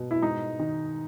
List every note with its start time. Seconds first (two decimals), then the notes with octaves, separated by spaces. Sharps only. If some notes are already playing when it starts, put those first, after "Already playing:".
Already playing: B2
0.11 E4
0.22 G#2 D#4
0.59 D#3